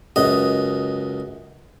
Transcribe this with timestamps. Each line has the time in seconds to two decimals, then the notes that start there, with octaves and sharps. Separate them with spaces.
0.16 C#2 F#2 D#5